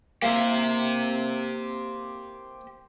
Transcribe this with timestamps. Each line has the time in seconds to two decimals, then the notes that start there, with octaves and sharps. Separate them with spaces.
0.22 A#3 E4 G4 C5